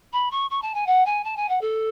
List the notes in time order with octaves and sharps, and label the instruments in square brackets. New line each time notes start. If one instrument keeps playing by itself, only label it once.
[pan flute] B5
C#6
C#6
A5
G#5
F#5
G#5
A5
G#5
F#5
A4